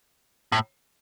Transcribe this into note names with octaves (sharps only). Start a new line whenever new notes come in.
A2